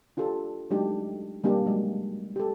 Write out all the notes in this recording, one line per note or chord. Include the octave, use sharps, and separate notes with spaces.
D4 F4 G4 A4
F#3 G#3 A3 D4 D#4 G4
G3 A#3 D4 G4
F#3 G#3
G4 A4